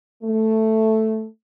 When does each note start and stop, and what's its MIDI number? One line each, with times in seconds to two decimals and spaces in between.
0.23 1.25 57